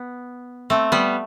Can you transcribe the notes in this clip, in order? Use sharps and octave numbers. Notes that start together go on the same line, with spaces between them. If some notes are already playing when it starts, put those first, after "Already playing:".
Already playing: B3
A3 C4
G3 B3